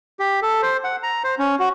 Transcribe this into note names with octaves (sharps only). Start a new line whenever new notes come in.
G4
A4
C5
F#5
A#5
C5
C#4
F#4